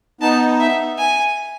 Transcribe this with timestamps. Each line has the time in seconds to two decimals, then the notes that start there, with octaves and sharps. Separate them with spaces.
0.21 B3 D#4 A5
0.60 E5
0.98 G#5